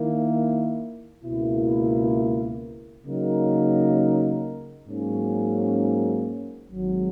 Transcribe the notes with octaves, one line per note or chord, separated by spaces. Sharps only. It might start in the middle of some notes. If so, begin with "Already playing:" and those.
Already playing: D#3 A#3 E4
C#2 B2 A#3 E4
C#3 F#3 A#3 D#4 A#4
G#2 F#3 A#3 C#4
G#1 G#2 F#3